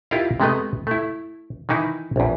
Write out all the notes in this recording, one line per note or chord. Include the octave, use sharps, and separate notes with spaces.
E4 F4 G4 A#4 D#5 F5
C3 G#3 A3 B3 D#5
A3 E4
D#3 E3 D#4 E4
A#1 E2